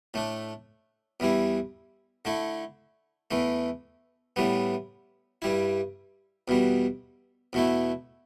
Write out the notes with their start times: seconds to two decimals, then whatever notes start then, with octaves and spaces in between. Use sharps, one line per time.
0.14 A2 A3 D4
1.20 E2 E3 G3 E4
2.25 D3 A3 E4
3.31 E2 E3 A3
4.36 A2 E3 G3 B3
5.42 G2 G3 E4
6.48 E2 B2 G3
7.53 E2 B2 A3 E4